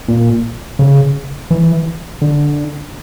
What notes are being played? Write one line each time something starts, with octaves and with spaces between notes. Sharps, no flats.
A#2
C#3
E3
D3